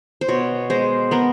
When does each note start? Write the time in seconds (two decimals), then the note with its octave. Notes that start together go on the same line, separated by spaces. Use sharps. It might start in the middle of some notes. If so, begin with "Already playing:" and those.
0.21 C5
0.28 B2 C#5
0.70 G#3 C5
1.11 B3 A#4